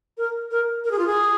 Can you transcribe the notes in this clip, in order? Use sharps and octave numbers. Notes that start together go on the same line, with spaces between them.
A#4
A#4
A#4
G#4
F4
G#4